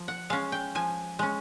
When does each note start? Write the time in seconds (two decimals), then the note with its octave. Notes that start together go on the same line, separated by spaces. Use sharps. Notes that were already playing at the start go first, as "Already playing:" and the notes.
Already playing: F3
0.08 F#5
0.30 G#3 C#4 F5
0.52 G5
0.75 F3 G#5
1.19 G#3 C#4